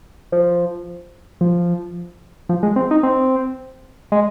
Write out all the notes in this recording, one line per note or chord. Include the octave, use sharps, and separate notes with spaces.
F3
F3
F3
G#3
C4
D#4
C4
G#3